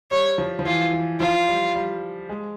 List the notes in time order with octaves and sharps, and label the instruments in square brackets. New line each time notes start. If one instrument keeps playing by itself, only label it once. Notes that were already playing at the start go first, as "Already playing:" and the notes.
[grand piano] G3 [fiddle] C#5
[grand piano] F3
F3
[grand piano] E3 [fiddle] F4
[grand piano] E3
[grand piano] F3 [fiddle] F4
[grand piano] G3
G3
G#3